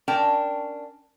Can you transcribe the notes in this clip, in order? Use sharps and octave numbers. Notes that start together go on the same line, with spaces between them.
C#4 D4 A#4 G5 A5